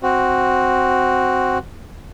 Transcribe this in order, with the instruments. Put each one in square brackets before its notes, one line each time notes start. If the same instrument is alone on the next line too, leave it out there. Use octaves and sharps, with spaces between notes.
[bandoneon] C4 F#4